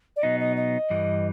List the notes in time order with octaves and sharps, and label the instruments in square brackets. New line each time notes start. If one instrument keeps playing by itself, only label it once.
[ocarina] D5
[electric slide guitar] B2 F#3 B3 D#4 [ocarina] D#5
[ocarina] D#5
D#5
[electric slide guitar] G2 E3 G3